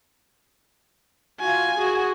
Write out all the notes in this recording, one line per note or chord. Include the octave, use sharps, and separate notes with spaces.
F4 F#4 G#5
F#4 G#4